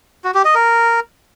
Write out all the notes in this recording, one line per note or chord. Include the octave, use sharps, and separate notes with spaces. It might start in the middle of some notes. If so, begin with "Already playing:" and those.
F#4
G4
D#5
A#4